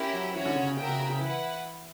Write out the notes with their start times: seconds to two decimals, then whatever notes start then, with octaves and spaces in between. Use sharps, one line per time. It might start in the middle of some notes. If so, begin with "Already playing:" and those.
Already playing: C#4 E4 G4 A#4
0.13 F#3
0.35 E3 C#4 F#4 C#5
0.46 D3
0.56 C#3
0.67 C#3
0.77 C#3 F#4 A#4 E5 G5
0.89 C#3
0.99 C#3
1.10 C#3
1.20 E3 E4 B4 F#5